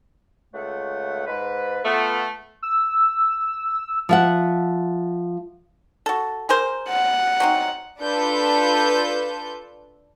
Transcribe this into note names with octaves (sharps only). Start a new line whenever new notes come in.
C#2 A3 F#5
G#2 B4
A3 B3 F4
E6
F3 E5 F#5
F#4 A4
G#4 A#4 C5
F#5
F#3 C4 D#4
D4 F4 A4 B4 A5 G6